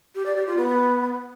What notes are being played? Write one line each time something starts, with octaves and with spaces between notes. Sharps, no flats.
G4
D5
G4
F4
B3